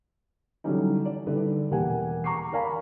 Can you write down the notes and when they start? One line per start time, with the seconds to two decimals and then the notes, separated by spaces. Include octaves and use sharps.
0.64 D3 E3 F#3 G3 C#4 D#4
1.05 D5
1.26 D3 D#3 G3 E4 B4
1.71 E1 A#3 G4 F#5 G#5
2.24 A#5 C#6 D6 C7
2.52 A#4 D5 F5 G#5 A#5 B5